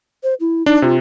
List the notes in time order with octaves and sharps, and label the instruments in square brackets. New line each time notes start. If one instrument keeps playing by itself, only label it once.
[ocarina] C5
E4
[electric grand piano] D4 [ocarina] D#4
[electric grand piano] C3 [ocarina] F4